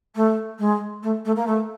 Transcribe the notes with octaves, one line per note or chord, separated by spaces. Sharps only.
A3
G#3
A3
A3
A#3
A3